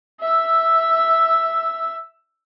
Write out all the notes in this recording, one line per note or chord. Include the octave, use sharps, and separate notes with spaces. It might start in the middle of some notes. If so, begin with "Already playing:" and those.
E5 E6